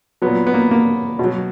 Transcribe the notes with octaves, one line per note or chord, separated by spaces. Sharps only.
A#2 F#3 B3
B3
A#3
A#3
B2 F#3